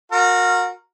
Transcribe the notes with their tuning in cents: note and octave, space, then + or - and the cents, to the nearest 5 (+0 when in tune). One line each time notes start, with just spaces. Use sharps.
F#4 -40 A#4 -10